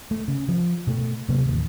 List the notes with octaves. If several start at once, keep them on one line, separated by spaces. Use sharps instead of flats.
A3
C#3
F3
B2 A3
C3 F#3 A#3 B3
A1 D#2